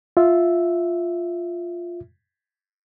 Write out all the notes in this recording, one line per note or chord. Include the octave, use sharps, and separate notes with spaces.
F4 E5